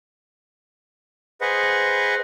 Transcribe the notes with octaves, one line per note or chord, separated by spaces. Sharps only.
G#4 B4 C5 D#5 F#5